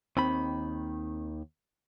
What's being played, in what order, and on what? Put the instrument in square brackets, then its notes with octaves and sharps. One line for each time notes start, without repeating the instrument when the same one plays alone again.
[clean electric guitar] D#2 D#3 B5 [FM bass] C4